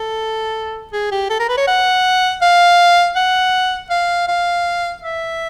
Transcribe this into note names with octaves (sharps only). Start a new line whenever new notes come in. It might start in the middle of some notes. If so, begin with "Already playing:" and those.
Already playing: A4
G#4
G4
A4
A#4
B4
C#5
F#5
F5
F#5
F5
F5
E5